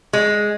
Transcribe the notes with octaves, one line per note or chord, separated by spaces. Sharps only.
G#3